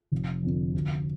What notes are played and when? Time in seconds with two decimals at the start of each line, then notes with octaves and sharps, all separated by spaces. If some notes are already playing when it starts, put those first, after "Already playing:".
0.12 F1
0.42 F2 D3 F3
0.74 D2